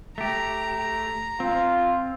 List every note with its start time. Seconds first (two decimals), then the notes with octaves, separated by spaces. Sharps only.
0.18 A3 G4 A#5
1.40 C4 F4